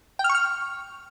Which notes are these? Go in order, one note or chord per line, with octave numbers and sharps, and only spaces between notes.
G5
F6
C#6
F6